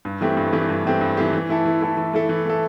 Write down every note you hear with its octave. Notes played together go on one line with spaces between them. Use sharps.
G2
E3 A3 C4 G4
G2
E3 A3 C4 G4
G2
E3 A3 C4 G4
G2
E3 A3 C4 G4
E3
A3 E4 A4
E3
A3 E4 A4
E3
A3 E4 A4
E3
A3 E4 A4